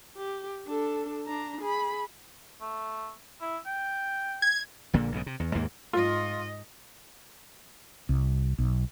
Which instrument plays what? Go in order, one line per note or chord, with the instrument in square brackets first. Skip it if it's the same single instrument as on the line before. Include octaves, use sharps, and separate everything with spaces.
[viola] G4
D4 A4
D4 A#5
G#4 B5
[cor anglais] A3
E4
G5
[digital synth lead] G#6
[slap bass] A#1 A#2 D3 A#3
B1 G#2 C#3
C3
E2
D#2 G#2 A#3
[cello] G#2 D#5 [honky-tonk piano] F4
[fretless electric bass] C2
B1